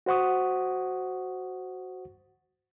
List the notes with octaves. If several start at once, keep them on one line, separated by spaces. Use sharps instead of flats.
F#4 C5 F#5 C#6 D#6